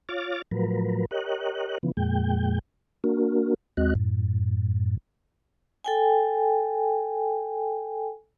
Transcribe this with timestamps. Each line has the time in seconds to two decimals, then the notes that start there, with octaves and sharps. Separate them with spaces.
0.09 F4 C#5 D6 F6 A6
0.51 A2 F3 F#3 A#4 B4
1.11 G4 A#4 C#5 D#5 F#6
1.83 C#3 E3 F3 B3
1.97 F2 A#2 G#3 G5
3.04 A#3 D4 F#4 A#4
3.77 D#2 G#3 C4 F#4 D#5 F#6
3.95 F#2 A2
5.84 A4 G5 G#5